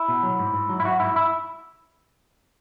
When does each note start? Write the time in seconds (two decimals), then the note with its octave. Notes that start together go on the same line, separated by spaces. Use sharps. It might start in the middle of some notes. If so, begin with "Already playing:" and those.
Already playing: E4
0.08 B2
0.23 F#3
0.39 G#2
0.54 G#2
0.69 F#3
0.80 E4
0.85 F#3 F#4
1.00 G#2 E4
1.16 E4